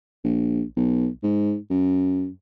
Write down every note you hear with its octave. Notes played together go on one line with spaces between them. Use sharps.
A#1
B1
G#2
F#2